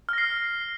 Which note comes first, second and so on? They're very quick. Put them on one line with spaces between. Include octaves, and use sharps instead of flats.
F6 A#6 C7